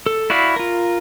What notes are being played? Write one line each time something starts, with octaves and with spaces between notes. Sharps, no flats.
A4
E4 F#4 D5 F5 B5
F4 A#4